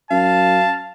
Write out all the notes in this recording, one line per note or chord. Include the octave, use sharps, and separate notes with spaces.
F#2 F5 A5